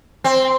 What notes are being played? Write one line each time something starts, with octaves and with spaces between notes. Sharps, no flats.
C4